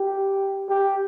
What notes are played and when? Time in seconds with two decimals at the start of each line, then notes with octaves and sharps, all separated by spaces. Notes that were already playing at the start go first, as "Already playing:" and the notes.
Already playing: G4
0.69 G4